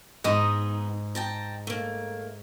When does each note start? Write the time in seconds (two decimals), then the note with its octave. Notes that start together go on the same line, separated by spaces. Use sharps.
0.24 G#2 B3 D#4 D#5
1.15 G5 A5 A#5
1.67 A3 A#3